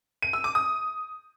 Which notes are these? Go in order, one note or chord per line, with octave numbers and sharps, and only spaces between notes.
D#7
E6
D6
D#6